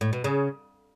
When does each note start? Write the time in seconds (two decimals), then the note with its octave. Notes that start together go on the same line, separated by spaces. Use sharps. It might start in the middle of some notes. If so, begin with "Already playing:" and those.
0.01 A2
0.13 B2
0.24 C#3